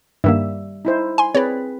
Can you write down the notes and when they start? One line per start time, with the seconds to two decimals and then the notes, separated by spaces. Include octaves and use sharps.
0.24 G2 D#3 G3 A#3 E5
0.85 D#4 E4 C5
1.18 G#5 C6
1.35 C4 G#4 B4 C#5 D5